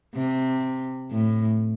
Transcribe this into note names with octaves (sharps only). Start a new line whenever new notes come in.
C3
A2